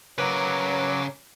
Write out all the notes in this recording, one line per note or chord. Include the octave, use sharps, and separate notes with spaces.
C#3 F#3 A#4 B4 C#5 D6